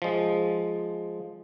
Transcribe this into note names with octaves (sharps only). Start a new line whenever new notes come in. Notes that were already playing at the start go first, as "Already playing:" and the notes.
F3 G#3